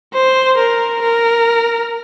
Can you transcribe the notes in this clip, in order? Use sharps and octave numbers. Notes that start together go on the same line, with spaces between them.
C5
A#4
A#4